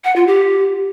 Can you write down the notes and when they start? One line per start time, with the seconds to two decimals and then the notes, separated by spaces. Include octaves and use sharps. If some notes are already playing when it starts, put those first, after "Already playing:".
0.04 F#5
0.16 F4
0.27 G4